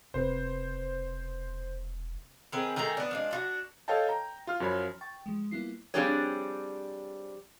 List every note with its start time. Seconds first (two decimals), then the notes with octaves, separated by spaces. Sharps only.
0.14 E1 C3 C4 B4 C5
2.52 D#3 C4 G#4 B4
2.76 D#3 A3 G#4 A#5
2.97 B3 D4
3.11 F3 G#3 D4
3.31 D4 F4 F#4
3.88 A4 C#5 D#5 F5 G5 A5
4.07 G5 A#5
4.47 F4 F6
4.60 F#2 F3 C#5 B5
5.01 G5 C#6 A6
5.26 F3 G#3
5.51 G3 A#3 B3 E4 F4 C7
5.94 F3 G3 C4 D4 G#4 C#5